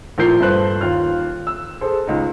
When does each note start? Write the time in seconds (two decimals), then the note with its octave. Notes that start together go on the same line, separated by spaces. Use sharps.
0.18 A#1 A2 F3 A#4 G6 C7
0.40 G2 A4 B4 C5 F#6
0.81 D#2 F4 F6
1.47 E6
1.81 G#4 A4 C5
2.07 C#2 D#4